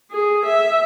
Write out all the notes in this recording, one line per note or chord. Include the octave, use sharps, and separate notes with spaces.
G#4
E5